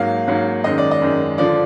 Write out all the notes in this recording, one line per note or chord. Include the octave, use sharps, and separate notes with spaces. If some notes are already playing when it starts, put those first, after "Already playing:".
Already playing: G#2 F#3 A#3 F5
G#2 F#3 A#3
F#2 D#3 G#3 D#5
D5
D#5
F#2 D#3 G#3
D3 F3 D5